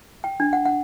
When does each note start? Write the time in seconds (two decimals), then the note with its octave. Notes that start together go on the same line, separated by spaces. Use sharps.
0.24 G5
0.40 D4
0.53 F#5
0.65 F#5